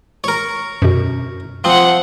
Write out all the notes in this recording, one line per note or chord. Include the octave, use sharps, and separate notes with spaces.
A#4 C#5
F#2 B2
F3 C4 C5 F#5